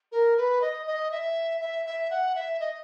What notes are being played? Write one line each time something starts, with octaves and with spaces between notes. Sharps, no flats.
A#4
B4
D#5
D#5
E5
E5
E5
F#5
E5
D#5